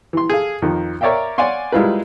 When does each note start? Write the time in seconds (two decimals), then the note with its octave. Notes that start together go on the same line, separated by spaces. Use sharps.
0.13 E3 C6
0.30 G#4 A4 F5
0.62 F2 D#3
1.01 A#4 C#5 D5 E5 F5 G5
1.38 C#5 D5 F5 F#5 G#5 C6
1.72 G3 G#3 E4 F4 A#4 B4